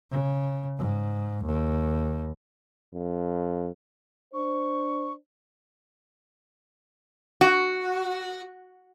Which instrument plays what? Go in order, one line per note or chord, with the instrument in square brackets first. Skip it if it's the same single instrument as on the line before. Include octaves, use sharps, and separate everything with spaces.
[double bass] C#3
G#2
D#2
[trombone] F2
[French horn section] D4 C5 [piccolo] C#6
[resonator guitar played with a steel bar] F#4